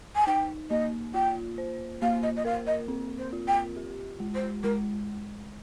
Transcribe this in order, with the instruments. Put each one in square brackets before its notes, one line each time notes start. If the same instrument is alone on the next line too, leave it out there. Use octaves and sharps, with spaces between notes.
[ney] G#5
[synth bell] D#4 [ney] G5
[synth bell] A#3 [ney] D#5
[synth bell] F4 [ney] G5
[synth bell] C5
[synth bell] A#3 [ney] F5
[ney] D#5
D#5
[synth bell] A#4 [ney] F5
[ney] D#5
[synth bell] C4
[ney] C5
[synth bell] F4
[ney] G5
[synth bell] G4
G#3
[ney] C5
[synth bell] G#3 [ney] A#4